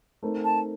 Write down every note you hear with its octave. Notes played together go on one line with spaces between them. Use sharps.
A3 C4 D#4 A#4
A5